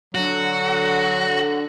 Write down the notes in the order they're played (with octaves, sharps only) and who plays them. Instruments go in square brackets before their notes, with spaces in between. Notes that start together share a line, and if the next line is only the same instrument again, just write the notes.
[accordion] D3 [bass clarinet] F#3 [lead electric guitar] F#4